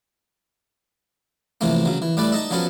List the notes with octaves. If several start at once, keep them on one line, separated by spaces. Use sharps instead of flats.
C3 E3 F3 A3 A#3
C#3 F#3
E3
A2 G3 A3 B4 D5
D#4 A4 D#5 E5
F3 F#3 B3 C#4 A4